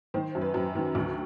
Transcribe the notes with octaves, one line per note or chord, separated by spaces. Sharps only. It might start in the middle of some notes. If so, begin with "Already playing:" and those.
D#3 C5
F#2
B4
F#2
D#3
D2